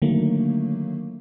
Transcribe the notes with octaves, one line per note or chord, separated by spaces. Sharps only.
D3 D#3 F#3 A3 A#3